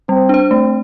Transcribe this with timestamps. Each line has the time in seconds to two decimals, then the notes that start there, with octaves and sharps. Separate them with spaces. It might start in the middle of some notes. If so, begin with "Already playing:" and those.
0.09 G3 C4
0.29 D4 C5
0.50 A3 C4